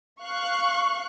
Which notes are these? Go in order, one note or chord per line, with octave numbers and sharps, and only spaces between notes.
F5 C#6 F#6